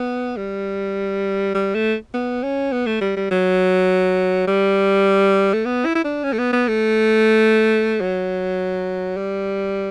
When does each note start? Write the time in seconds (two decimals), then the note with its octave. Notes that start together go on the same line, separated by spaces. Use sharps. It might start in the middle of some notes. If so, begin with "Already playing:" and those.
Already playing: B3
0.37 G3
1.55 G3
1.75 A3
2.14 B3
2.43 C#4
2.72 B3
2.87 A3
3.01 G3
3.16 G3
3.31 F#3
4.47 G3
5.54 A3
5.65 B3
5.85 E4
5.95 E4
6.04 D4
6.24 C#4
6.33 A3
6.39 B3
6.53 B3
6.68 A3
8.01 F#3
9.17 G3